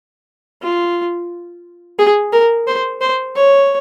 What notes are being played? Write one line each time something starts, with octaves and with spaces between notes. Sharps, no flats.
F4
G#4
A#4
C5
C5
C#5